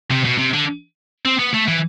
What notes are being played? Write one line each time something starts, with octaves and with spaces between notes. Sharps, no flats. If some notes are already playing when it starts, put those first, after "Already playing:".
C3
B2
C3
D3
C4
B3
A3
E3